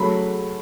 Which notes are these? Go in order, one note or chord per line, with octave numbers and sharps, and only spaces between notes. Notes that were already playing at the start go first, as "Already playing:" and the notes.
Already playing: C#3 F#3 A3 B5